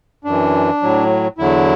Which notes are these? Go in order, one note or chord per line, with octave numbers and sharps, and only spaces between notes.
F#2 E3 D4
A2 F#3
E2 D3 F#3 E4